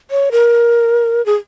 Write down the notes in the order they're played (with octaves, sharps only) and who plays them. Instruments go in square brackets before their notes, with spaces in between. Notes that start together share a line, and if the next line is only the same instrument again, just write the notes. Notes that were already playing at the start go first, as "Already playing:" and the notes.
[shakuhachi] C#5
A#4
G#4